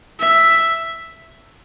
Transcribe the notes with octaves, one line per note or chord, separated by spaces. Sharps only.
E5